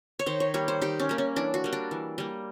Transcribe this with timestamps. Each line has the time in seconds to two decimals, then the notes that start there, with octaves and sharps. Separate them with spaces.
0.19 C#5
0.26 D#3 C5
0.40 C#5
0.54 G3 A#3 C#5
0.68 C5
0.82 D#3 G4
1.00 C#4
1.09 G3 A#3
1.18 C#4
1.36 E3 D4
1.54 F#4
1.64 G3 A#3
1.73 D4
1.91 E3
2.18 G3 A#3